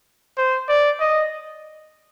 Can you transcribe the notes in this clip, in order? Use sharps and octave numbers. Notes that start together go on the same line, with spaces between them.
C5
D5
D#5